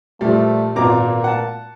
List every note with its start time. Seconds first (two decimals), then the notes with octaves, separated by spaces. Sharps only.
0.21 A#2 F3 G3 A3
0.76 G#1 A#2 A#3 B3 A#5 D6
1.24 F#5 A5